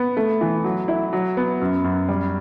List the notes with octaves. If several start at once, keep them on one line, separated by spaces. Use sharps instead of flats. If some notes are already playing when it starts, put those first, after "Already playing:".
Already playing: B3
A3
E3
F#3
E4
F#3
B3
F#2
F#2
G3